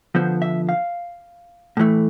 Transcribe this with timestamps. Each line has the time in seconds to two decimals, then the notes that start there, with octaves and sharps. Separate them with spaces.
0.15 D3 F3 B3 C5
0.42 E5
0.69 F5
1.77 A2 E3 A3